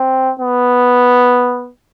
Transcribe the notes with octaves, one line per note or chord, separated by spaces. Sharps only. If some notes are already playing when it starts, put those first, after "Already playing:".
Already playing: C4
B3